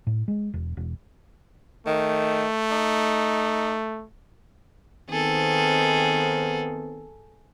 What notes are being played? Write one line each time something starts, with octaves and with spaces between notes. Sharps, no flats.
A2
G#3
E1
E1
D#3 A3
D#4
D#3 B3 C4 G#4 A4